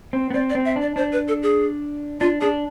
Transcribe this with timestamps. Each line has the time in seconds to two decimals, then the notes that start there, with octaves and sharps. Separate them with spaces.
0.13 C4
0.30 B3
0.34 C4 D5
0.50 D5
0.55 C4
0.65 E5
0.76 D4
0.82 D5
0.96 D4 C5
1.13 B4
1.28 A4
1.43 G#4
2.20 D4 F4
2.41 D4 G#4